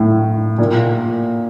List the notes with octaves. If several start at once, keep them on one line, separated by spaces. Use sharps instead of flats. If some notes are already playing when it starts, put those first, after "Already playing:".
Already playing: A2
A#2